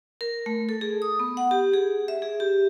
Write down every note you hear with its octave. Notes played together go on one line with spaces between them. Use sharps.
A#4
A3
A4
G#4
D#6
B3
F#5
G4
G#4
E5
G#4
G4